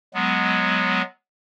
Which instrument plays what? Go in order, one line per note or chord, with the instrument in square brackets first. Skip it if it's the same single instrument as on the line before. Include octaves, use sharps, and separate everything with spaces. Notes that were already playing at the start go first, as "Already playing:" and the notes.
[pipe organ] F#3 G#3 B3